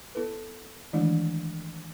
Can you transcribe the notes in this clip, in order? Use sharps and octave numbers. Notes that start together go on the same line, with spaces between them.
B3 E4 A4 B4
D#3 E3 G#3 A3 D4 E4